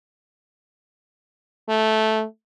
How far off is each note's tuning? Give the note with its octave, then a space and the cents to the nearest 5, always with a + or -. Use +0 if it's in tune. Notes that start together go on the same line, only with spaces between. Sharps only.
A3 -10